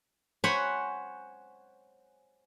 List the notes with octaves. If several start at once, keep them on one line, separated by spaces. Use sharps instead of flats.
C5 C#5 F#5 G#5 B5